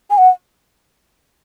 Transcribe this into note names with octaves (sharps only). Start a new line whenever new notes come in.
G#5
F#5